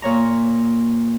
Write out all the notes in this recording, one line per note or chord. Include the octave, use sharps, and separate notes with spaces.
A#2 C#5 A#5